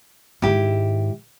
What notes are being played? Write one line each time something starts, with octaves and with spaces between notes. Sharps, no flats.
G#2 D#3 E4 G4